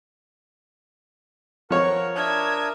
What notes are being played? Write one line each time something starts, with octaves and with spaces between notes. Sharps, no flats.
F3 A#4 C#5 F#5 C#6
D4 A#4 E5 D#6 G#6